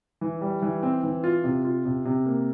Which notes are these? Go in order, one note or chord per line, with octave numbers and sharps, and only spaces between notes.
E3
G3
E3
C4
E3
F4
C3
F4
C3
C3
A#3